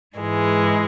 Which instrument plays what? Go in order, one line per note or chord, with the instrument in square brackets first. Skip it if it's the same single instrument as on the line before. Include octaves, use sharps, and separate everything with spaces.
[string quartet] G#2 E3 G#3